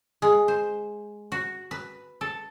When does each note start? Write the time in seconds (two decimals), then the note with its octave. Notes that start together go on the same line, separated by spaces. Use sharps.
0.22 G#3
0.48 C5
1.32 F#4
1.71 B4
2.21 A4